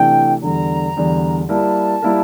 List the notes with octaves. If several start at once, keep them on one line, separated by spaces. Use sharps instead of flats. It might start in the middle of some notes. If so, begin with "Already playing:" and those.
Already playing: C3 E3 A3 D4 G5
E2 D3 G3 A#5
E2 D3 G3
G3 A#3 E4 A#4 A5
G3 A#3 E4 A#4